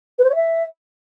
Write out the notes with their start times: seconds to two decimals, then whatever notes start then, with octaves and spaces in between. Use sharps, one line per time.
0.19 B4
0.24 C5
0.30 C#5
0.35 E5